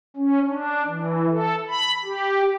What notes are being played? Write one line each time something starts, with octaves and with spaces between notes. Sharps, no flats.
C#4
D4
E3
A4
B5
G4